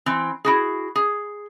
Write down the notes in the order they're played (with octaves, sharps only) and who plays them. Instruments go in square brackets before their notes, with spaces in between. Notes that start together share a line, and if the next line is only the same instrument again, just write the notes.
[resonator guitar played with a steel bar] E3 C4
E4 F#4 G#4
G#4